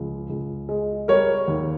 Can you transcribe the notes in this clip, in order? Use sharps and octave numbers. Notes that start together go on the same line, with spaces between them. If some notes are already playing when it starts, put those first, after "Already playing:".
Already playing: C#2 F3
C#2
G#3
G3 A#4 C#5
D#2